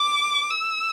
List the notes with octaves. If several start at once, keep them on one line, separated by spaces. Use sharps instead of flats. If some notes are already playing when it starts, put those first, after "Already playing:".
Already playing: D6
E6